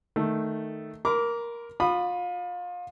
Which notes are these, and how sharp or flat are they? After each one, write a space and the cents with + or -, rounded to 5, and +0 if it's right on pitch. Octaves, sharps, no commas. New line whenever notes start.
D#3 +0 A3 +0
A#4 +10 B5 +45 D6 -20
F4 +30 B5 +0 D#6 -30